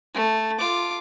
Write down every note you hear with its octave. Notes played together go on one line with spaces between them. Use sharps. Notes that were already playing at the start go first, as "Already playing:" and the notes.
A3
F4 D6